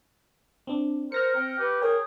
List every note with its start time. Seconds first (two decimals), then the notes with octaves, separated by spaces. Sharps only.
0.67 C4 D4
1.12 A#4 C5 F6 A#6 C#7
1.36 C4 G5
1.59 G4 B4
1.82 G#4 A#4 C#5 G5